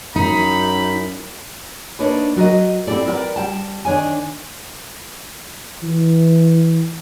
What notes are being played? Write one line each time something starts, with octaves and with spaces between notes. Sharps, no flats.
F#2 D#4 B5
A#3 D4 D#4 B4 C#5
F#3 F#4 A#4 D#5
C4 E4 G4 A4 D5
A#4 B4 D5 G5
G3 G5 A5
D#3 D4 C#5 G#5
E3